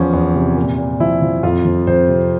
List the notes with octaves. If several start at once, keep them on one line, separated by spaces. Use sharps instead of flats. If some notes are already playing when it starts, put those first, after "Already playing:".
Already playing: E2 F3 C#4
E2
C3
A#2
A#2
F3 E4
F3
F2 F4
F3
F2 C5
C3